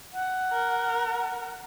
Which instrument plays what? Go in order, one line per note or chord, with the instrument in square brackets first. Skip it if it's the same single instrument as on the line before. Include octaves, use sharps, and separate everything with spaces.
[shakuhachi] F#5
[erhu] A#4